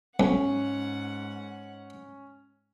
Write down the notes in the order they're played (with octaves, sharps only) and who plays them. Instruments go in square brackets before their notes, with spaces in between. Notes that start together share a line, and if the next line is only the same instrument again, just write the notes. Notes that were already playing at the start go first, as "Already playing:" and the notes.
[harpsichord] B1 [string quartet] G#2 F#5 [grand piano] C#4